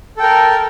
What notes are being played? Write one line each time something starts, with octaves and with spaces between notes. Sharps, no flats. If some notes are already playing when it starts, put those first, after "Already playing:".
A4 A#4 G5